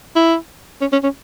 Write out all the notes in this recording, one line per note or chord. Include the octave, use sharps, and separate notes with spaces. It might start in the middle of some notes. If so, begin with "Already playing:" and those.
E4
C#4
C#4
C#4